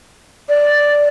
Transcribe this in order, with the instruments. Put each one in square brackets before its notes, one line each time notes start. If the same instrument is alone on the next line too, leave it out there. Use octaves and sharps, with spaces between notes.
[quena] D5